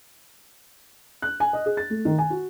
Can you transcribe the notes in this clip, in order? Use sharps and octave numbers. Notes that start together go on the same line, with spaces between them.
F#6
G#5
D#5
G#4
A6
A3
D#3
G#5
F#4